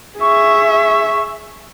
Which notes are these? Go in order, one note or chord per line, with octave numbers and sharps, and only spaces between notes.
G#4 E5 C#6